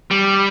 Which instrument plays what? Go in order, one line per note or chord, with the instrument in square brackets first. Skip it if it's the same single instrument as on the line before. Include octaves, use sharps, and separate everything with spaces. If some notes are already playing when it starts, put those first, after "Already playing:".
[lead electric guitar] G3